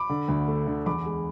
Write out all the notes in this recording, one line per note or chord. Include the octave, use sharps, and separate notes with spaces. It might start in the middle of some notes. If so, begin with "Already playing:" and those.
Already playing: B5 D6
D3
D2
A3
D3
E2 B5 D6
G#3